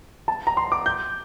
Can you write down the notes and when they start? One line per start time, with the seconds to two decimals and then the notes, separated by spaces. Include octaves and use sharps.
0.28 A5
0.47 A#5
0.57 C6
0.72 D6
0.86 G6